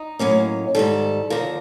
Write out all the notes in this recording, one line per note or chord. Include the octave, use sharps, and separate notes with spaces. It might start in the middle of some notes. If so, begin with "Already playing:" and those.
Already playing: D#4
A2 F#3 A#3 C#4
G#2 D#3 G3 A4
D#2 D3 F3 A#4